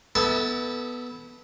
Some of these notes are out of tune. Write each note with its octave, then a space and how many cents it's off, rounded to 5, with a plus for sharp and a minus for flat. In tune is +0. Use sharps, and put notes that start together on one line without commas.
B3 -5 E4 -30 A4 +0